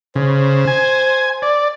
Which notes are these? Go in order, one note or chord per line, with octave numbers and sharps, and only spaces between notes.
C#3 C5
G#5
D5